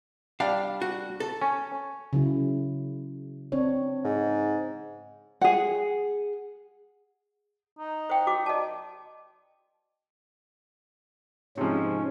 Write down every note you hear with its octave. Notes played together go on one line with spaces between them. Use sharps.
G3 D4 F5
F#4
A4
C#4
C#3 F#3 E4
C4 D4 C#5
G#2
G#4 F#5
D#4
C5 G5
F#4 D6
D5 D#5 A5
G#2 C3 F3 C#4